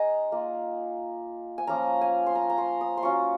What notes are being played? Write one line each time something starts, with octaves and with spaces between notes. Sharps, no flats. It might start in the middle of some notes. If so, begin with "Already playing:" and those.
Already playing: G#3 D#4 G#5 A#5
A#3 F4
G#5
F3 A#3 C#4 A#5
G#5
C6
A#5
A#5
C6
D#6
C6
F#3 C#4 F4 C#6